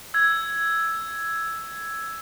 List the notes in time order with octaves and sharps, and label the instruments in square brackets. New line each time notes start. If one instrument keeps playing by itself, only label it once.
[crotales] E6 G#6